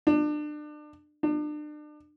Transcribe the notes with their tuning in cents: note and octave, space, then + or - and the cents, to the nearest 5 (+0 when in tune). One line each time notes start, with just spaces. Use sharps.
D4 +30
D4 +35